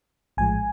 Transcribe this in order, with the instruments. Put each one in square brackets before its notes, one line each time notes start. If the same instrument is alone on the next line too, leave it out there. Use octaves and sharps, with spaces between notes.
[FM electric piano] A#1 A2 F3 G#3 G#5